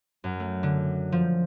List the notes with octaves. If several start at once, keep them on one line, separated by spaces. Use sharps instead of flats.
F#2
A3
D3
F3